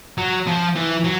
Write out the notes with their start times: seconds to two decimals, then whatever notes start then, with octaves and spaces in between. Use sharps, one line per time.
0.18 F#3
0.47 F3
0.75 E3
1.04 F#3